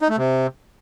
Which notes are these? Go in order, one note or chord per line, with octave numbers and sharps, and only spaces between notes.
D#4
A3
C3